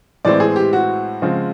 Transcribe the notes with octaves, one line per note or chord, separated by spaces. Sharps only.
A2 E3 G#3 C4 D5
G#4
G4
F#4
C#3 F3 G#3 C4